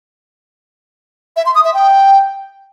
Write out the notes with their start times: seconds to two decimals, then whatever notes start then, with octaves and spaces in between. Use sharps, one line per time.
1.36 E5
1.46 C6
1.55 D#6
1.65 E5
1.74 G5